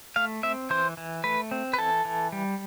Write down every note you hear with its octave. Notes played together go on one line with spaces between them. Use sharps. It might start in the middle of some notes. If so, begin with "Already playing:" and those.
A3 F5
C4 E5
E3 C5
E3
A3 B4
C4
B4
E3 A4
E3
G3